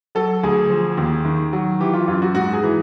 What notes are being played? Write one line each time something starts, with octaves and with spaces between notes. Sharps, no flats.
F#3 A4
D2 G#4
F3
D#2
D#3
F#3
E3 G4
F4
F#2 F4
F#4
G#2 F#4
G#4
E3